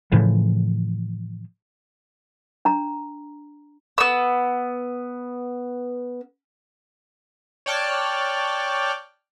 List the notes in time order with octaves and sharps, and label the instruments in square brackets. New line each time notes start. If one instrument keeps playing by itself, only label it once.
[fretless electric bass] A2 C#3 E3 F3
[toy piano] D4 A#5
[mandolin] B3 E6
[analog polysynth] C#5 D5 G5 A5 F6 F#6